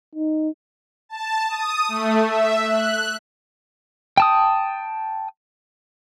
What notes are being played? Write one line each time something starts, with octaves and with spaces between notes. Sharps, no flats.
D#4
A5
D#6
A3
E5
F#6
G5 A5 D#6